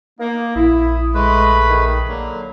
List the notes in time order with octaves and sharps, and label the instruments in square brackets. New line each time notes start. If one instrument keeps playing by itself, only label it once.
[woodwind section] A#3 [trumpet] D#4
[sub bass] A#1 [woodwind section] E4 [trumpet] D#6
[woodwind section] G#3 [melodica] A3 B4 [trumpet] B5
[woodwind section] D#3 G#4
[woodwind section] D3 F#3 [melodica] A#3